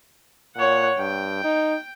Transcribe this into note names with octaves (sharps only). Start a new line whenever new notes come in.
A#2 C#5 F#5
G2 G5
D#4